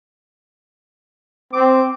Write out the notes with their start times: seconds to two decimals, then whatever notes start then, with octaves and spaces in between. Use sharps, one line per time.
1.53 C4 D6